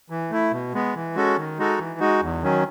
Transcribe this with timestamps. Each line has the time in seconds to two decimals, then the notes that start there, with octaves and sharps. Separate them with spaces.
0.10 E3
0.31 A3 E4
0.52 B2
0.74 G#3 B3
0.95 E3
1.15 G#3 C#4 F#4 A4
1.37 D#3
1.58 G#3 D#4 F#4 A4
1.78 E3
2.00 G#3 D#4 F#4
2.22 E2
2.43 D#3 F#3 C#4